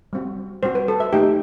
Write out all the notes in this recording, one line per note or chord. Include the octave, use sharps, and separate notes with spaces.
G3 C4 F#4
G3 C4 F#4 C5
B4
A4
E5
A3 D#4 G4